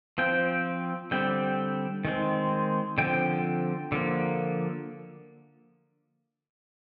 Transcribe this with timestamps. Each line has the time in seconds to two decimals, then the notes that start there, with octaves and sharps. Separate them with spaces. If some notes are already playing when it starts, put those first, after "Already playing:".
0.18 F3 C4 G5
1.11 D3 G3 C4 G5
2.05 D#3 G#3 C4
2.98 D3 F3 C4 G5
3.92 D3 F3 A#3